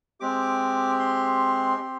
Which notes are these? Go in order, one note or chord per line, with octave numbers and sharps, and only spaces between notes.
G#3 C4 G4 D6
C6
C4 G4